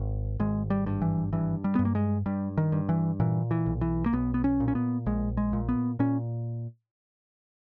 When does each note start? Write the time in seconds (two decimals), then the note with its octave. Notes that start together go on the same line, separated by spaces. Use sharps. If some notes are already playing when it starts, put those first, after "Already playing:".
Already playing: G#1
0.40 G#1 G#3
0.70 G3
0.86 G2
1.02 E3
1.33 G2 E3
1.64 G3
1.75 G2 B3
1.85 A#3
1.95 G#3
2.26 G2 G3
2.57 D#3
2.72 G2
2.89 E3
3.20 A#2 E3
3.51 E3
3.66 B1
3.81 E3
4.06 A#3
4.13 B1 B3
4.34 B3
4.44 C#4
4.60 A#2
4.68 C#4
4.75 B3
5.06 A#1 G#3
5.37 G#3
5.53 A#2
5.69 B3
5.99 A#2 C#4